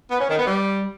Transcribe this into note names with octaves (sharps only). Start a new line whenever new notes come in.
B3
C#4
D#3
B3
G3